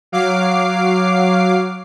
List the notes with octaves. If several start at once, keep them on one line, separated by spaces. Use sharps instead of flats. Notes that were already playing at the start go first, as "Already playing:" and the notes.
F#3 F5 D6 C7